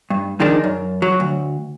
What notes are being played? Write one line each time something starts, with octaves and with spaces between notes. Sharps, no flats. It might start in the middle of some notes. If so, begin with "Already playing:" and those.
G2
F2 D#3 G#3 D4
F#2
F#3
D2